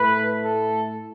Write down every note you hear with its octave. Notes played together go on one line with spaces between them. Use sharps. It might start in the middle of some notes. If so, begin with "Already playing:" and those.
Already playing: A2 A3 B4
A4